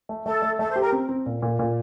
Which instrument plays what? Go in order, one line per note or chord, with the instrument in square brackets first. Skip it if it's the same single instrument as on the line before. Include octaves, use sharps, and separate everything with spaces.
[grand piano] A3
[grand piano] A3 [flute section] A4
[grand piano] A3
[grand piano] A3 [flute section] A4
[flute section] C5
[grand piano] G4 [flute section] A#4
[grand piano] C4
C4
A#2
A#2
A#2